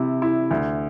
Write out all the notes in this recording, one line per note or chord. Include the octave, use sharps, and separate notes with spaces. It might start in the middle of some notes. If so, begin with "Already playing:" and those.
Already playing: C3 E4
E4
D2